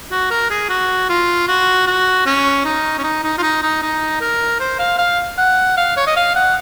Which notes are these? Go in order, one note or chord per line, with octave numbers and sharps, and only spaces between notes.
F#4
A#4
G#4
F#4
F4
F#4
F#4
C#4
D#4
C#4
D#4
D#4
F4
D#4
D#4
D#4
A#4
C5
F5
F5
F#5
F5
C#5
D#5
F5
F#5